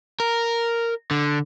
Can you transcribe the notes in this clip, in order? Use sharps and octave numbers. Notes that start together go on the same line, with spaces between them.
A#4
D3